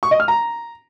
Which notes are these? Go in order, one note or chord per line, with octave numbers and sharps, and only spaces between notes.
C#6
D#5
F6
A#5